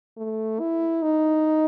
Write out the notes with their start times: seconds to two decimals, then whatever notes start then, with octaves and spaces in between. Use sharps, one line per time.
0.17 A3
0.60 E4
1.03 D#4